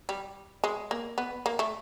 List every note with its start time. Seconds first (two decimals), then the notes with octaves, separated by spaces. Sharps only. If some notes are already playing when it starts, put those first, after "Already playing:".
0.09 G3
0.64 G#3
0.91 A#3
1.18 B3
1.46 A#3
1.59 A3